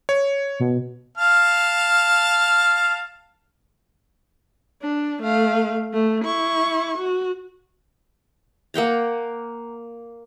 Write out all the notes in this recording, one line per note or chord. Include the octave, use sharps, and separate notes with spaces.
C#5
B2
F5 A5 F6
D4
A3 F5
A3
E4 C#6
F#4
A#3 F#5 G5 A#5